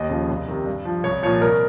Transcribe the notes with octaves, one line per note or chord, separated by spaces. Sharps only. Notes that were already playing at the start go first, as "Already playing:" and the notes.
Already playing: D#2 D#5
C#3 F3
C2
C3 D#3
G2
F3
C2 C#5
A#2 F3 C#5
C2 A#4